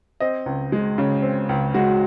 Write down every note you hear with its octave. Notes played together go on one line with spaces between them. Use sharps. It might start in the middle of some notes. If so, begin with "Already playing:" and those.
C4 D#5
C#2
G#3
C#3
C4
C#2
G#3 F#4